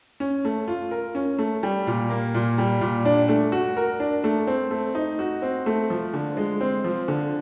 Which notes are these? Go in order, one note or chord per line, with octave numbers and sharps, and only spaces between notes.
C#4
A3
F4
A#4
C#4
A3
G3
A#2
A#3
A#2
G3
A#2
D4
A3
F#4
A#4
D4
A3
C4
A3
D#4
F#4
C4
A3
F3
D3
G#3
C4
F3
D3